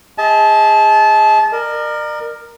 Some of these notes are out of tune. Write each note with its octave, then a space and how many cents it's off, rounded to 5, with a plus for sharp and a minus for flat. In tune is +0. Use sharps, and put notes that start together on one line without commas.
G#4 -30 D#5 +35 A5 -25
A#4 +0 D5 +40